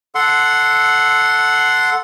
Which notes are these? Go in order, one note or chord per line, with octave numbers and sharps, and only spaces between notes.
A4 F#5 C6